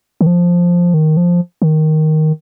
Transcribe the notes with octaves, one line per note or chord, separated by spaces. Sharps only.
D#3
F3
D#3
F3
D#3